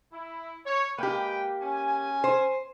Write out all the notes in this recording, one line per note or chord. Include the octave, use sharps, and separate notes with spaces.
E4
C#5
G#3 A#3 G4 B4 G5
C#4 G#5
C5